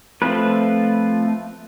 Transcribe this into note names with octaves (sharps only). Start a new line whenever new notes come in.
F3 A3 C4 F4 B4